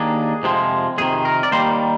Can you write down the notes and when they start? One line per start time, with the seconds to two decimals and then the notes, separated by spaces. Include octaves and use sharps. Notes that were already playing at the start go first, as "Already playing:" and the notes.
Already playing: D#2 D#3 A#3 D4 G#4
0.43 F2 C3 F3 G#3
0.98 F2 C3 D#3 G#4
1.25 A#4
1.43 D5
1.52 D#2 D#3 G3 A#3 C5